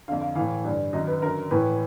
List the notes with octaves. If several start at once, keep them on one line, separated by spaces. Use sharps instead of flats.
F2 D3 F5
F5
A2 E3 F5
G2 D3
F#2 D#3 D#5
B4
F#2 D3 A#4
A2 E3 B4